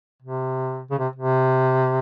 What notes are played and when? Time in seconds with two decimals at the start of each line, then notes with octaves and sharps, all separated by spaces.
0.22 C3
0.90 C#3
0.99 C3
1.16 C3